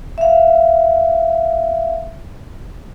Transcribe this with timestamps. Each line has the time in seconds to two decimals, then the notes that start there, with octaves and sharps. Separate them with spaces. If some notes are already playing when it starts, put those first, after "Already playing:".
0.18 E5 F5